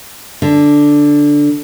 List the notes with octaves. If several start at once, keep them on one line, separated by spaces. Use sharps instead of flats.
D3